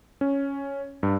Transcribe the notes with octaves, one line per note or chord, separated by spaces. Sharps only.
C#4
G2